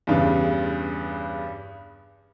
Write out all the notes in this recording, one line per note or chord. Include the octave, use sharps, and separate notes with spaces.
E2 G2 C#3